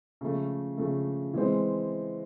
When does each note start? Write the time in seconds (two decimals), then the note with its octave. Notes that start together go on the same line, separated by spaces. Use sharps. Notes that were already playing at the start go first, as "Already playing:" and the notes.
0.21 C#3 F3 A3
0.77 C#3 F3 A3
1.34 E3 G#3 C4